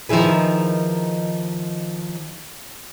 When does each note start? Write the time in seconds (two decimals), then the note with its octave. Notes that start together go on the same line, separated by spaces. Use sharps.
0.09 D#3 F3 D#4 E4 G#4 B4